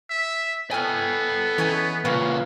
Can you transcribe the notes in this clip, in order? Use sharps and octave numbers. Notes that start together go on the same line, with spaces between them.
E5
B3 A4 G5 G#5 F6
E3 C#4 D#4 G#5 G#6
C#2 A#2 A#3 C#4 B4 F5 F#5